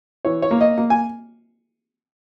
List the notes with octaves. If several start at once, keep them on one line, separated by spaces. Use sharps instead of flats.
E3 C#5
C#5
A#3
D#5
A#3
G#5